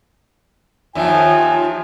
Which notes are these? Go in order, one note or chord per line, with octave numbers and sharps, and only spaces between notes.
D#2 D#3 F3 F4 E5 G5 G#5